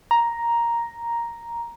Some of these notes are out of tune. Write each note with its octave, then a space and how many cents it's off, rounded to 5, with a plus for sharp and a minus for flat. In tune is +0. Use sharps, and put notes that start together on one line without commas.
A#5 +5